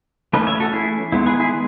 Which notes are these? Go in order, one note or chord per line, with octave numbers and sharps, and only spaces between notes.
E3 A3 C#4 B4 D#5
C#5 E5
F#4 A4
E4 G#4
D#3 G#3 B3 E4
G#4 B4
E4 G#4